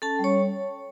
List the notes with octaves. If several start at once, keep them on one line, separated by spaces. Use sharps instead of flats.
C#4 A4 A5
G3
C#5 C#6